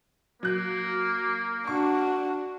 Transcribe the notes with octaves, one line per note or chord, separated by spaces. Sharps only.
F#3 A#3 F#6
D4 F#4 C#6